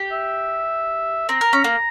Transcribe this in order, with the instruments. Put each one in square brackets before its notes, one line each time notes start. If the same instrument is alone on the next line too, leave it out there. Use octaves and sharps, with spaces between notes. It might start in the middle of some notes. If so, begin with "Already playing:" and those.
Already playing: [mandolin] G4
[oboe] E5
[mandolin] C4 [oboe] A#5
[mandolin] A#4
C#4
A#3